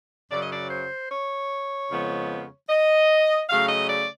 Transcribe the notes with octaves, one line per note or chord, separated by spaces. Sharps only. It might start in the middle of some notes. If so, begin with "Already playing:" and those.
F#2 C#3 F#3 D5
D#5
D5
C5
C#5
F2 C#3 F3 G#3 B3
D#5
C#3 F#3 A3 F5
D#5
D5